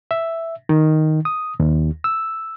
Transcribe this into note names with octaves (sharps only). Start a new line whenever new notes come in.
E5
D#3
D#6
D#2
E6